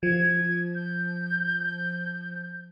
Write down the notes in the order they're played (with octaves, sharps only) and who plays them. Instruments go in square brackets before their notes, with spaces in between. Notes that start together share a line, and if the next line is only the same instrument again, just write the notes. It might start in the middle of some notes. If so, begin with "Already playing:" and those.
[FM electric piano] F3 [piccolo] G#6
[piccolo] G6